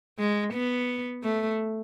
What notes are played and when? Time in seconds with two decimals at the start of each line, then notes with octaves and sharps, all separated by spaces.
0.19 G#3
0.54 B3
1.24 A3